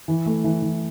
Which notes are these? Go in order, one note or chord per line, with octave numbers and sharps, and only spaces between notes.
E3
A3
E3
E3